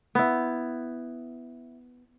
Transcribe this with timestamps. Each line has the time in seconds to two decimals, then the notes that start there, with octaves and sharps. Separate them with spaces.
0.15 B3 E4